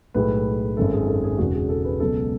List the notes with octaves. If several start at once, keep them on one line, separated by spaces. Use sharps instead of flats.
B1 A2 G#3 B4
G#1 F#2 D#3 G#3 A4
G#4
A4
G#4
E1 E2 C#3 F#4
G#4
A4
B4
C#2 B2 F#3 A4